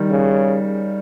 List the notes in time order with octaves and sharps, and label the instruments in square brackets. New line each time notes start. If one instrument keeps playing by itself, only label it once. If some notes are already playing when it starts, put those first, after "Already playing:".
Already playing: [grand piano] D#3 G3
[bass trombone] C#3